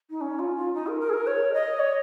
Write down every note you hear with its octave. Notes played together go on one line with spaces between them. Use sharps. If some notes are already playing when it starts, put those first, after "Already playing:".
D#4
C#4
F4
F4
D#4
A#4
A#4
G#4
A#4
C#5
D#5
C#5